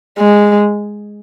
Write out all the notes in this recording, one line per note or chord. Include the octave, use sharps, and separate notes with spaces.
G#3